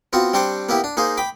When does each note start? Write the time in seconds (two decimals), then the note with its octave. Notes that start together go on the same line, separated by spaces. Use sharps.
0.13 B3 C4 F4 F#4
0.33 G3 C4 D4 C5 C#6 D6
0.69 A#3 B3 E4 G4
0.84 D4
0.97 A#3 D#4 G#4 C5
1.17 G5 B5 D6